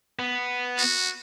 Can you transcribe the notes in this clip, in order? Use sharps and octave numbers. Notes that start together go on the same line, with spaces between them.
B3
F#4